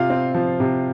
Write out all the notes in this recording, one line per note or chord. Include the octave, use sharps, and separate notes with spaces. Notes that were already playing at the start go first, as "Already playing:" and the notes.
Already playing: C3 F4 F5
C4
F3
C3